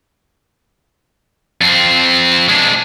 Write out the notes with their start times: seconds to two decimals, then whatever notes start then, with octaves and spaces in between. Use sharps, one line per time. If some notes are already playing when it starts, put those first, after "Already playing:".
1.61 F2 C4
2.49 G#3 D4